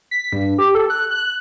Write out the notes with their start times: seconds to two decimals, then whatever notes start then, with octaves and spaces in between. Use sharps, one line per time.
0.11 B6
0.33 G2
0.58 G4
0.75 A4
0.90 F#6
1.11 F#6